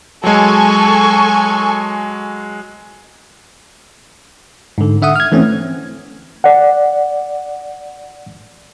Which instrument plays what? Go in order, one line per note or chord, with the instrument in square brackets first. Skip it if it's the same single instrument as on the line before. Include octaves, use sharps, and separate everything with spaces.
[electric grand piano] F#3 G#3 [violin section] A4 G#5 C#6
[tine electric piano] G#2 D3
D3 E5 F#5 D#6
F6 G#6
E3 A3 C4 C#4
[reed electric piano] D5 F#5